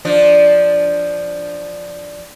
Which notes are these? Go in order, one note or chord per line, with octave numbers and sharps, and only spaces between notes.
F3 D4